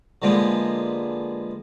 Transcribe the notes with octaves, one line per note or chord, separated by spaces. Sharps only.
D3 F3 G#3 A#3 B3